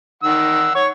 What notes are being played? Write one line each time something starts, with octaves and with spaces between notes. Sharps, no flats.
D#3 F#5 E6
C#5 C#6